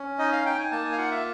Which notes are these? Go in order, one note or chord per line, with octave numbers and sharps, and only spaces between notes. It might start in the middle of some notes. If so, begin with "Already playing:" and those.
Already playing: C#4
D#4 D#5
F5
D#4 G5
G#5
A#3 A5
G#5
F5
F4 F#5
E5